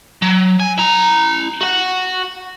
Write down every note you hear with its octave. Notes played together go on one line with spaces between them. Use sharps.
F#3
G#5
E4 A#5
F#4 F#5